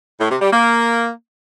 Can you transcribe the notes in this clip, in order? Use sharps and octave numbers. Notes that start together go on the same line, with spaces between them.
A2
C3
G3
A#3